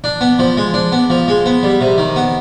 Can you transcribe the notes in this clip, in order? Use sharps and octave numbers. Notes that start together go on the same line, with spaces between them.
D4
B3
F3
G#3
D4
B3
F3
G#3
B3
G3
C3
D#3
B3